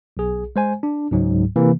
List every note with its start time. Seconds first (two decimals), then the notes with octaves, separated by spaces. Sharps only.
0.17 B1 G#4
0.56 G#3 C5 G#5
0.83 D4
1.11 C#2 G#2 F#3
1.56 C3 E3 A#3